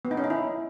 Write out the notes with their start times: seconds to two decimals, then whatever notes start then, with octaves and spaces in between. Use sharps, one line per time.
0.05 B3
0.11 D#4
0.17 C#4
0.24 D#4
0.30 E4